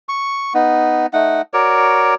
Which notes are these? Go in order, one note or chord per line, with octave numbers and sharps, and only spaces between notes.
C#6
B3 D#4
A3 D#4 F#5
F#4 A#4 C#5 D5